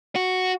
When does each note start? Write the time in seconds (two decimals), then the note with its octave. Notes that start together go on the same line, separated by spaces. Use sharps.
0.16 F#4